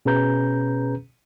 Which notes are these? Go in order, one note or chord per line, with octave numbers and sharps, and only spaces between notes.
B2 C#4 G#4 B4 A#5 G6